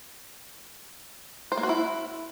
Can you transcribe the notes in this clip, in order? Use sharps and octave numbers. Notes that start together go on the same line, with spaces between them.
C5
A#3
F#4
E4